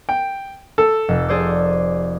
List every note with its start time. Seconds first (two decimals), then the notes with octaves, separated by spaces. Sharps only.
0.09 G5
0.78 A4
1.08 F1
1.28 G#4 C5 D5